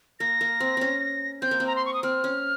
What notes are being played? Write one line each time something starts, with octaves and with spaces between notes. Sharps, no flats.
A#3 A#6
A#3
C4
C4 C#4
C4 G6
A#3
C4
A#5
C6
C#6
D#6
C4 F6
C#4